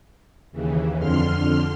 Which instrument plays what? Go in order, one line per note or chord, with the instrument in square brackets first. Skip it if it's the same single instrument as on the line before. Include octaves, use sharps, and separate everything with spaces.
[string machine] D#2 C#3 E3
F2 D3 C6 F6